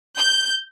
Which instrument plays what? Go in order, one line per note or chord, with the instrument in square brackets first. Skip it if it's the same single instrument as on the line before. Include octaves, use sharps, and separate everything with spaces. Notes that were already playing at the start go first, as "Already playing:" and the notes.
[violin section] G6